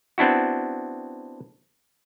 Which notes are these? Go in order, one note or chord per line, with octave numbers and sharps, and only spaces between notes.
B3 C4 D4 E4 F#4